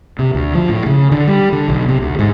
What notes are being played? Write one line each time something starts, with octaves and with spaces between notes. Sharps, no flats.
C3
D2
F3
A2
C#3
D3
G3
D3
B1
C3
D2
G#2